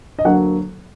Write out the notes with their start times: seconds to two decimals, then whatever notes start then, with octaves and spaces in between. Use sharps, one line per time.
0.19 D#5
0.25 D2 D3 F#3 A#3 F#5